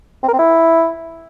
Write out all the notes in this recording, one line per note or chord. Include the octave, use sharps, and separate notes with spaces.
C4
A#4
C4
E4